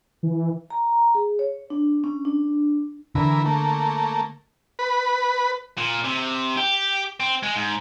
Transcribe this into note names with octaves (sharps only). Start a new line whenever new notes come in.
E3
A#5
G#4
C#5
D4
C#4
D4
D3 E3 A#4 B4
A3 A#3
B4
A#2
C3
G4
C4
G#3
G#2